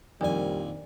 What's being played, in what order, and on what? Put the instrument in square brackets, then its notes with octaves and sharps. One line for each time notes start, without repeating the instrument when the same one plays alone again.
[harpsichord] A#1 G#5 [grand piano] F2 D#3 [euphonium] G3 [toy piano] D4 D5